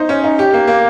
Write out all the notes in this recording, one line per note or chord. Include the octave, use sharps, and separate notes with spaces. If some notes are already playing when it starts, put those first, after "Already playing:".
Already playing: D#4 C5
C#4
D#4
G4
A#3
A#3